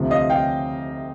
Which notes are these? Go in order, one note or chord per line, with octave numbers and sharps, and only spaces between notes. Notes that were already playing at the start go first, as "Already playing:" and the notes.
Already playing: D2 C3 F3
D#5 F5
F5 G5